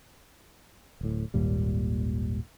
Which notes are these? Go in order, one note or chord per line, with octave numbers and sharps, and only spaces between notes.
D1 A2
G#1 D#2 A#2 G3